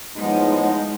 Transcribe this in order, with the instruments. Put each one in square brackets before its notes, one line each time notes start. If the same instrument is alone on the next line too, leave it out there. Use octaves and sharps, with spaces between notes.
[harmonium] A2 F3 B3 [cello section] G#3 D#4